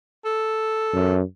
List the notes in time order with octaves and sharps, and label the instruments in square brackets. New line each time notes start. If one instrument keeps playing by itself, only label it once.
[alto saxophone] A4
[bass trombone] F#2